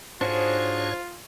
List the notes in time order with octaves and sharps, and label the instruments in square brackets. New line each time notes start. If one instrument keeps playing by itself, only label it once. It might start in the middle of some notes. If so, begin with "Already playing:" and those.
[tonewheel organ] G#2 C#5 [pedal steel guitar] D4 F#4 G#4 [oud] D#4 C5 [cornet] F4